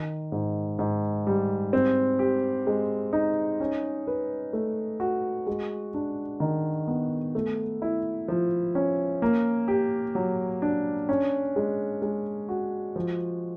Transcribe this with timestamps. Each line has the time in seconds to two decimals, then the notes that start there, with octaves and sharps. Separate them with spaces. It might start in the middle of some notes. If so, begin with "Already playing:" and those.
Already playing: D#3
0.32 G#2
0.79 G#2
1.27 G3
1.73 C4
2.19 G4
2.67 G#3
3.13 D#4
3.60 C#4
4.07 B4
4.53 A3
5.00 F#4
5.47 G#3
5.94 D4
6.40 D#3
6.87 B3
7.35 A3
7.82 E4
8.28 F3
8.75 C#4
9.22 A#3
9.68 G4
10.15 F#3
10.62 D4
11.09 C#4
11.56 G#3
12.02 G#3
12.49 F#4
12.96 F3